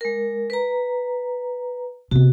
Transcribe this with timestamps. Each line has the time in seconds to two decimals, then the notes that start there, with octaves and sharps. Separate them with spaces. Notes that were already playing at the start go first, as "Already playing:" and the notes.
0.01 G#3 A#4
0.50 B4 A#5
2.11 C3 B3 F#4